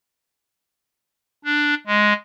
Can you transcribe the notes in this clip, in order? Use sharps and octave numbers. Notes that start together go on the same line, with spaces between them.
D4
G#3